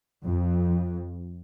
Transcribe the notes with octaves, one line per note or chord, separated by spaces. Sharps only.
F2